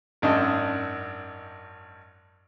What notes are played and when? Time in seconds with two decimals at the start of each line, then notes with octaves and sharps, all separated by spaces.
0.22 G#1 F#2 D4 D#5